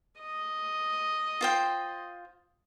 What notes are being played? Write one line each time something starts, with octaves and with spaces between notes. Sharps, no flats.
D#5
F4 C5 G5